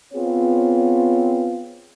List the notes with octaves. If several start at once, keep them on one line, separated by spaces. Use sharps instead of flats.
B3 C4 F4 G#4 C#5